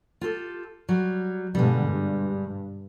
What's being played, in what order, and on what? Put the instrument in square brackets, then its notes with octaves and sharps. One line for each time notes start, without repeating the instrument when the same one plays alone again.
[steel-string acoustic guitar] F4 G4 A4
F#3 G3
[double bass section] G2 B2 D3 [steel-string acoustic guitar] G3 G#3
[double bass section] G2